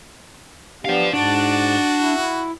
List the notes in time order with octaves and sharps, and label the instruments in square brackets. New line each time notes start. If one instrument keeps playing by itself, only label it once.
[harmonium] B3 D4 G4 [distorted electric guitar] C5 F5
[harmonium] G#2 [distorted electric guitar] D4 [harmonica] F#4
[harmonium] E4